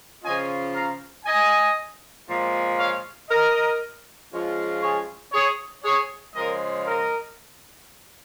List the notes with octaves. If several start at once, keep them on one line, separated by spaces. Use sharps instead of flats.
C#3 F3 C#4 F4 D#5 G#5
F5 A#5
D#5 G#5
A#2 F3 G#3
C#5 F5
A#4 D#5
F3 G#3 C#4 F4
G#4 C#5
G#4 C#5
G#4 C#5
C#3 F3 G#3 A#4 D#5
A#4 D#5